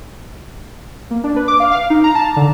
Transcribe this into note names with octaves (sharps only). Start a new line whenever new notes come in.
A#3
D4
B4
D6
F5
F5
D#4
A#5
A5
D3